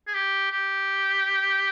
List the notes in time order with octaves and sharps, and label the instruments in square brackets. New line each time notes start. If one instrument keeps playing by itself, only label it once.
[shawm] G#4
G4
G4